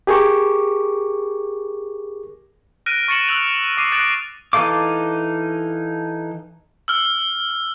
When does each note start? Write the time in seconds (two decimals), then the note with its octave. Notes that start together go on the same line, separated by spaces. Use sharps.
0.07 G4 G#4 A#4 C#6 D6
2.86 F6 F#6 A#6 D7 D#7
3.08 C#6 A6 A#6 C#7 E7 F#7
3.28 E6 F#6 F7 F#7
3.77 D6 D#6 C7 D#7
3.92 D#6 F#6 A6 A#6 C7 D7
4.53 E3 D#4 A4 F5 D6
6.88 E6 F6